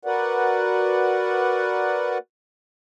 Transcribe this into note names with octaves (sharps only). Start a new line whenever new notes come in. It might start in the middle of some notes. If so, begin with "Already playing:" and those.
F#4 A#4 B4 D5 F#5